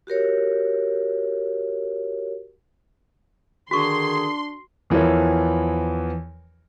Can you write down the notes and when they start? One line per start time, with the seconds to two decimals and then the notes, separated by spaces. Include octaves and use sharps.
0.07 F#4 G4 A#4 C#5
3.71 D3 D#3 D4 F#4 G#4 C6 C#6
4.90 E2 E3 F3 A#4 C#5